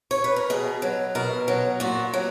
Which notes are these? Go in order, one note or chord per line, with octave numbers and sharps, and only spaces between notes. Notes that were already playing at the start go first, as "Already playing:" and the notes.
C#5
B4
A#4
B2 G#4
F#3
B2 A#4
F#3
A#2 F#4
F#3